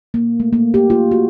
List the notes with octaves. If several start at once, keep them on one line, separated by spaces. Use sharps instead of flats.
A#3
A3
A#3
G4
F4
F#4